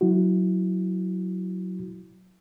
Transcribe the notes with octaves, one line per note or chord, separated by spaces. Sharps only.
F#3 E4 F#4